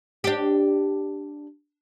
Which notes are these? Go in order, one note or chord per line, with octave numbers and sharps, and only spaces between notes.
D4 G4